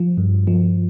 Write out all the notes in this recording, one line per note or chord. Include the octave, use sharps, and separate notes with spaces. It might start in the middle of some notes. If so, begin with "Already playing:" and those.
Already playing: F3
G2
F3